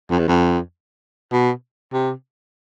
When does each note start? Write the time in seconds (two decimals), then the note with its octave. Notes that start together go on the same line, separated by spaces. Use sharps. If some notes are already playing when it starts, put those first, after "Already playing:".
0.10 F2
0.19 E2
0.28 F2
1.32 B2
1.93 C3